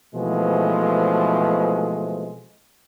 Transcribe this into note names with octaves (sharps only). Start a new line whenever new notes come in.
B2 E3 F3 G#3 A3 C4